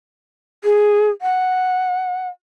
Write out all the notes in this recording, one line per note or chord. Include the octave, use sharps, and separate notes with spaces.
G#4
F#5